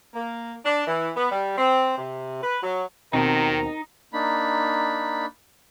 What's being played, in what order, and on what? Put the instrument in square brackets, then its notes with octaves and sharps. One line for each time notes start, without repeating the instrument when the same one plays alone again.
[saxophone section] A#3
D4
E3
B3
G3
C4
C3
B4
F#3
[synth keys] D#2 B2 C4 [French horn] D#3 [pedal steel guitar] D#4 [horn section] A#4 A#5
[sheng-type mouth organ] A#3 D4 D#4 B5